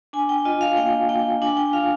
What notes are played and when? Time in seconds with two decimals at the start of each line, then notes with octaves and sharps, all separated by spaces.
0.13 D4 G#5
0.29 G5
0.45 F4 D#5
0.61 F5
0.77 A#3 G5
1.09 A#3 G5
1.42 D4 G#5
1.57 G5
1.73 F4 F5